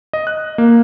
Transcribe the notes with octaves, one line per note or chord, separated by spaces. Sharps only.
D#5
F#6
A#3